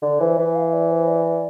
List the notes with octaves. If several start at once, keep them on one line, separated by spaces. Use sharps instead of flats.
D3 D5
E3 C5
E3 E5
F5
D5
C5
D5